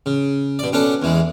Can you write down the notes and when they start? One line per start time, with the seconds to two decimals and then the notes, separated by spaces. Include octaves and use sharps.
0.06 C#3
0.59 B2 D5
0.73 B2 C#4 D4 A4
1.02 E2 E3 G#3